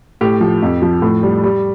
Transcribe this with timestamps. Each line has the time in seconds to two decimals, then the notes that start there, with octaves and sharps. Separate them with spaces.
0.21 A2 G4
0.41 F3
0.62 F2
0.82 F3
1.02 A2
1.23 G3
1.44 G3